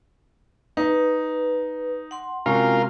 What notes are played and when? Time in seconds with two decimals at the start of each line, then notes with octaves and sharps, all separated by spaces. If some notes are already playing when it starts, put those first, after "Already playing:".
0.77 D#4 B4
2.11 F#5 C6
2.46 C3 G#3 C#4 F4 F#4 A#4